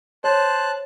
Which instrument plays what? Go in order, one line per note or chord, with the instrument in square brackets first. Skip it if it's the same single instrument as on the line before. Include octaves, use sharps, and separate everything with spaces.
[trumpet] C5 [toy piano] C#5 [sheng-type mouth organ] A5 F#6